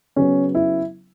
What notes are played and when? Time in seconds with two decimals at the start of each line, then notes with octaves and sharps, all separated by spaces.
0.16 C#3 F#3 B3 C#4
0.55 E4